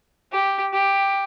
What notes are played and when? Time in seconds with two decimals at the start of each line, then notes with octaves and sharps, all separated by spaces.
0.32 G4
0.74 G4